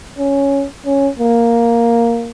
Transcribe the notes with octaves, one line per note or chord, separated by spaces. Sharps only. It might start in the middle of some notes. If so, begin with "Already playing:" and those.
C#4
C#4
A#3